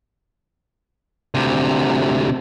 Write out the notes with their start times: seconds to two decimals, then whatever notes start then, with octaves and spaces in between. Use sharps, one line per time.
1.35 D2 C3